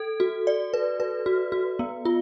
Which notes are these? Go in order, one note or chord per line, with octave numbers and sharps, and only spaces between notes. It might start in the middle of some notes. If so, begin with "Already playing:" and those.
Already playing: A4
F#4
D5
B4
B4
F#4
F#4
B3
F4